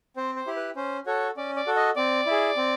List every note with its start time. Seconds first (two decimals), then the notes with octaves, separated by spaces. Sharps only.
0.17 C4 C5
0.36 C5
0.47 E4 G4
0.56 B4
0.76 C#4 C5
1.06 F#4 A4 C#5
1.37 C#4 D5
1.56 D5
1.66 F#4 A4
1.76 D#5
1.96 C4 D5
2.26 E4 G#4
2.57 C4